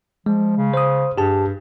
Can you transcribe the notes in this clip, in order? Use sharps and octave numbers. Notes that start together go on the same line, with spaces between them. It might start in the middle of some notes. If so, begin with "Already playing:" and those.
F3 G#3
C#3
C5 D#6
G2 G4 G#4 A5